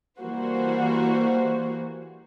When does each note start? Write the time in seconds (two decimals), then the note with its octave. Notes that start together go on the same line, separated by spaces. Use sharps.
0.20 E3 G3 A#3 F#4 C5